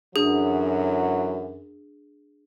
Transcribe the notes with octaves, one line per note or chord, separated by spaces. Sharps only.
F#2 D3 E3 F#3 D4 G#4